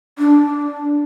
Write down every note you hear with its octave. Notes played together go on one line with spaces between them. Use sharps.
D4